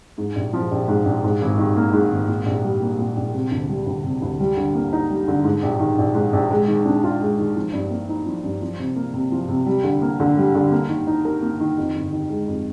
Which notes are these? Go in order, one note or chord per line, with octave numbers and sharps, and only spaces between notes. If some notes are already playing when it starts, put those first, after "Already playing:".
G#2
A#1
F3
A#1
G#2
A#1
G#2
G#1
D#3
A#3
G#2
G#1
A#2
A#1
G3
A#3
A#2
A#1
C3
D2
G3
D2
C3
D2
G3
D3
A#3
D#4
G3
D3
G#2
A#1
D#3
A#1
G#2
A#1
G#3
D#3
D4
F4
G#3
D#3
F3
G2
A#3
D#4
F3
G2
F3
C3
A#3
C3
F3
C3
G3
D3
A#3
D3
G3
D3
A#3
D#3
D#4
A#4
A#3
D#3
F2
G1
D#3
G#3
F2